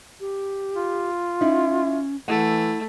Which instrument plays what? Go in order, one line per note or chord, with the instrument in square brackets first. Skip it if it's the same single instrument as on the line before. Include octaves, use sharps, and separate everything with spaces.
[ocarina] G4
[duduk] F4
[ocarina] C#4 [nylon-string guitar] D#4 E4
[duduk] E3 [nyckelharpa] A3 [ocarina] E4 [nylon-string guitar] F#5